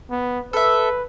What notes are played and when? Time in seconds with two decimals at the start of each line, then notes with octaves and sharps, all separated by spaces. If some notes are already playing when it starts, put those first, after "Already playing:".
0.11 B3
0.53 A4 B4 E5